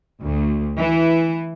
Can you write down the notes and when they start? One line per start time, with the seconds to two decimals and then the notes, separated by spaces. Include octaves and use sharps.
0.21 D2
0.77 E3